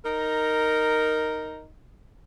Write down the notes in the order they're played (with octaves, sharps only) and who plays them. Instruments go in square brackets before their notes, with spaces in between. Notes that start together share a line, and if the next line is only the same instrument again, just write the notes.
[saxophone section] D#4 A#4